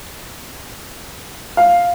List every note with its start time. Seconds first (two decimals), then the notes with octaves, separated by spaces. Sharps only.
1.57 F5